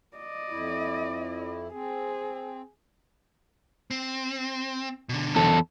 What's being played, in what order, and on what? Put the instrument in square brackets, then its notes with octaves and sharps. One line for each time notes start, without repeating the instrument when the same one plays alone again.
[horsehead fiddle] D5 D#5
[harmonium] F2 E4
[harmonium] C4 [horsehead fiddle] G#4
[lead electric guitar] C4
B2 D3
[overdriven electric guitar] E2 A4